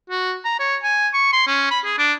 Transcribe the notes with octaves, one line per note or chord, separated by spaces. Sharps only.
F#4
A#5
C#5
G#5
C#6
C6
C#4
B5
G#4
D4